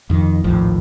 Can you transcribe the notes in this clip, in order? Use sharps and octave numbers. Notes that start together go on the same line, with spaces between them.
F2 D#3
A#1 D#2 A2 F3